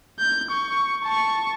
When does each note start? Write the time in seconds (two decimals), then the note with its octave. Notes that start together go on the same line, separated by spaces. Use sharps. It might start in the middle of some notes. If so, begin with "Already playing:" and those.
0.19 G6
0.51 C#6
1.05 A5 C#6